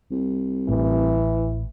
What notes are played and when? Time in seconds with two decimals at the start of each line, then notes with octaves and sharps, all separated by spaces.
0.11 C2
0.69 A1 A2 E3